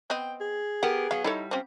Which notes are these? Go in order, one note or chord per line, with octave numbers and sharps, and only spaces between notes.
B3 C4 D#5 G5
G#4
B3 G4 A#4 F#5
F#3 B3 F5
G3 D#4 E4 A4 C#5
F3 C4 C#4